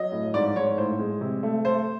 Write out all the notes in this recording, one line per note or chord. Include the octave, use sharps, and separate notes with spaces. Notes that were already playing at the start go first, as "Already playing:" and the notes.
Already playing: F#3 D#5
A2
G#2 D5
G#2 C#5
A2 C5
G#3
C3
A3
A3 C5